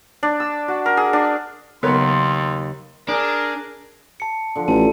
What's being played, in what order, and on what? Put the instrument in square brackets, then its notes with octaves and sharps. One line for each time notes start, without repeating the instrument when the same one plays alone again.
[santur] D4
E6
F#4
A#4
G#4
D4
[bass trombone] D#2 [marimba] C#3 F#3 [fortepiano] B3 A#4 C#5 [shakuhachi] C6
[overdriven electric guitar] D4 [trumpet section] G#4 A#4
[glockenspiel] A5 C#7
[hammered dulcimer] D3 F3
[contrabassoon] A1 [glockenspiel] A5